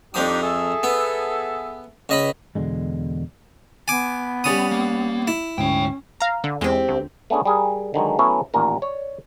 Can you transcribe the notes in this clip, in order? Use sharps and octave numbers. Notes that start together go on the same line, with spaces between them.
F2 F3 D4 D#4 G4 D#6
G#4 A4 E5
B3
C#2 D#5 B5
E2 B2 D3 G#3
B3 G#5 D6
G3 C#4 D#6
A#3
E4
D2 G#2 C#4 C#5 G5
F5 A#5
D3
E2 G#3 C4 G4
D2
A3 B3 C#4 D4 G#4
G3 G#4 A#4
D3 D#3 F#3 G#3
F#3 A3 B3 C#4 E4 C#5
A1 D#2 A#2 A#4
C#5 D5